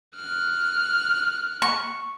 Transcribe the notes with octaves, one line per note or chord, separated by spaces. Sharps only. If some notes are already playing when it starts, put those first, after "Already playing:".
F6 F#6
C#6